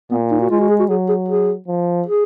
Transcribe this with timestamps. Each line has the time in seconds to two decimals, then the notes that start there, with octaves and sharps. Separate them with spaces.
0.11 A#2 B3
0.31 D#4
0.41 F#4
0.50 G#3 F4
0.60 F#4
0.70 G#4
0.80 F#4
0.89 F#3 G#4
1.09 G#4
1.28 G#4
1.67 F3
2.07 G#4